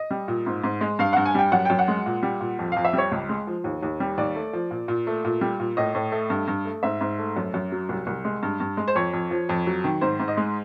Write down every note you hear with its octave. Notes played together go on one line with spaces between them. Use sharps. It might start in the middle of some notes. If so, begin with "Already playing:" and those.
Already playing: D#5
G3
A#2
G#2
G#2
G#3
G2 F5
G2 F#5
G#5
G3 G5
F#2 F#5
F#2 G5
F#5
G#3
A#2
G3
A#2
F2
F2 F5
E5
G3 C#5
C#2
G#3
F3
D#2
D#2
G3
D#2 D5
A3
F3
A#2
A#2
A3
A#2
G3
A#2
A2 D#5
A2
A3
G2
G2
A3
G#2 E5
G#2
A3
F#2
F#2
F#3
C2
C2
G#3
G2
G2
G#3
C5
F2 C#5
F2
F3
F2
F#3
D#3
G#2 C5
G#2
D#5
G#3